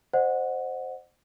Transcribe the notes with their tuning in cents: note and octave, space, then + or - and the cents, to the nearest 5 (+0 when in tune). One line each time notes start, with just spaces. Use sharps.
C5 +0 D#5 -35 F#5 -5